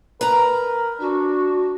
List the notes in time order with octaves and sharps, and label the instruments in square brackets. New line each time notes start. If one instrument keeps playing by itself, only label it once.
[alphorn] A#4 [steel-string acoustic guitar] B4 A#5
[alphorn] D4 [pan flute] F#4